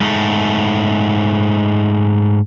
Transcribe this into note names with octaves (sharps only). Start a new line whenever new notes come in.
G#2 A3